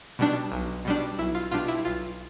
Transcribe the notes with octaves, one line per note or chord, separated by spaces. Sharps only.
B2 G3 D4
B1
B2 G3 D4
B1 E4
F4
B2 G3 D4 F4
E4
B1 F4